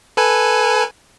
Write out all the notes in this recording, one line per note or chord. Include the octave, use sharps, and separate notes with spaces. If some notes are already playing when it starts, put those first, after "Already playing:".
A4 B4 G#5